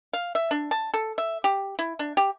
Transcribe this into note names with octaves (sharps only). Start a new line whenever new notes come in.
F5
E5
D4
A5
A4
E5
G4
E4
D4
G4